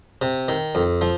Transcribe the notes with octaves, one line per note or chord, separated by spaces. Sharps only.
C3
D#3
F2
F3